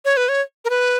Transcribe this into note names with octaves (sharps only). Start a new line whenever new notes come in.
C#5
B4
C#5
A#4
B4